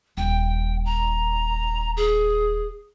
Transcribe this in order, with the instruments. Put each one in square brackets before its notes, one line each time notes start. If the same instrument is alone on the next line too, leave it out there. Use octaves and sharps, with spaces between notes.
[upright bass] D#1 [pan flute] G5
[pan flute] A#5
G#4